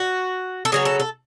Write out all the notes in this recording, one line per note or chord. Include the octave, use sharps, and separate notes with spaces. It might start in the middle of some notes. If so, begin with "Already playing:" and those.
Already playing: F#4
A4
C#3 F#3 B3 G#4
A4
A4